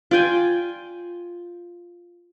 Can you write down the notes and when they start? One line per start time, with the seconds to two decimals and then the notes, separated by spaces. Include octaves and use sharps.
0.11 F4 D5 G5 G#5